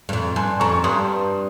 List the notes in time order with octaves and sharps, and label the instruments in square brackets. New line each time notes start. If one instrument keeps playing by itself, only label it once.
[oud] G2
F2
[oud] G2 [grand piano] G#5 C6
[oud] F2 [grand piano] A#5 C#6
[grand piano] C#6
[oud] G2 [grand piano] C6 D#6